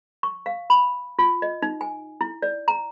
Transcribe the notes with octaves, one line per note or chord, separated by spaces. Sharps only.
C#6
F5
B5
F4
D#5
D#4
G#5
E4
D5
A#5